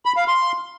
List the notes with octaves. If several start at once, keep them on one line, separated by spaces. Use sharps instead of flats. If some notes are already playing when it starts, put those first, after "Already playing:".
B5
F5
C6